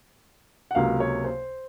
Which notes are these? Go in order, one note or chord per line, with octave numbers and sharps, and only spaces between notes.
F#5
C#2 C3 F#3 A#3 F5
C#5
C5